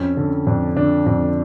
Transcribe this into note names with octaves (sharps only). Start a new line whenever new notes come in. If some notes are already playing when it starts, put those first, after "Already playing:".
Already playing: F2 C#4
D3
F2 D4
D3 D4
F2 D4